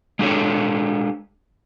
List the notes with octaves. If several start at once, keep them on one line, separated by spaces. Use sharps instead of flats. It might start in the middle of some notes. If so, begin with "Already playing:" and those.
G#3 D4 G4 A4 C#5